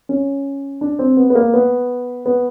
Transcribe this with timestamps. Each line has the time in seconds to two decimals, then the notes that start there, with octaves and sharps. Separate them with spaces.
0.09 C#4
0.81 D4
0.99 C4
1.17 B3
1.30 B3
1.35 A#3
1.54 B3
2.26 B3